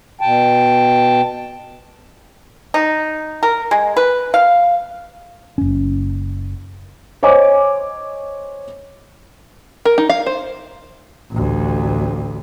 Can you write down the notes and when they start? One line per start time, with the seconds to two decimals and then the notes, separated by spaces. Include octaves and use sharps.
0.21 B2 G5 A5
2.74 D#4
3.43 A#4
3.71 G#3
3.97 B4
4.34 F5
5.58 F#1 C#4
7.23 C5 C#5 D#5 G#5 D6
9.85 A#4
9.98 D#4
10.09 F5
10.26 C5
11.31 A1 D2